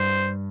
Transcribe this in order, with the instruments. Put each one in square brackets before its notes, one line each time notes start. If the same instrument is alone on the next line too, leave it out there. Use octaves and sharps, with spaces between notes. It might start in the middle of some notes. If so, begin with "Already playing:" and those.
Already playing: [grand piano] G2 [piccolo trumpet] C5